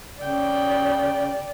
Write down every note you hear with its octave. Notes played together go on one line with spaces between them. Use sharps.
C#3 D5 G5